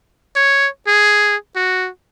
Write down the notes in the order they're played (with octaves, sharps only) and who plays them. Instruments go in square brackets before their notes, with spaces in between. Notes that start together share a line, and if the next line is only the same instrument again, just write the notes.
[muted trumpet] C#5
G#4
F#4